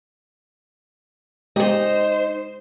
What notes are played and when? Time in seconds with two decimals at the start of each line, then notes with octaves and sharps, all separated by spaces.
1.56 G#3 D#4 G4 C5 D#5